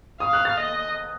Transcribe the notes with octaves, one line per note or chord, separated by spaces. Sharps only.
F5 D#6
F#6
A6
D#5